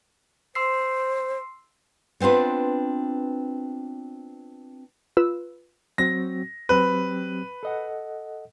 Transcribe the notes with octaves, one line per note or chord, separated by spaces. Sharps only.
C5 C6 E6 C7
B3 C4 D4 F4 B4
F4 B4 E6
F#3 C4 F#4 A#6
F#3 C4 G4 B4
A4 D#5 F#5